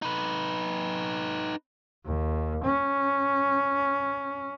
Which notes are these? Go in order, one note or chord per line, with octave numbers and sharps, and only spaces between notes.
D#4 B4
D#2
C#4